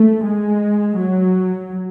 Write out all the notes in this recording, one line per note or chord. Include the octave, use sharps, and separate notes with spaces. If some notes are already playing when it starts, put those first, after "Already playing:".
Already playing: A3
G#3
F#3